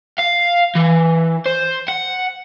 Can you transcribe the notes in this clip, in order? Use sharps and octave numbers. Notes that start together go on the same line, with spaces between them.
F5
E3
C5
F#5